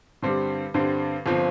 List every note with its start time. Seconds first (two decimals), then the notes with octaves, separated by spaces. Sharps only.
0.22 G2 D3 G3 C4
0.74 G2 D3 G3 C4
1.26 G1 F3 C4